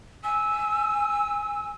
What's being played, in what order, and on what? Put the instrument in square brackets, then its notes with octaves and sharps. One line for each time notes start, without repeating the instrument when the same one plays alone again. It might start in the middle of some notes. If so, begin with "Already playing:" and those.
[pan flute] G#5 [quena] E6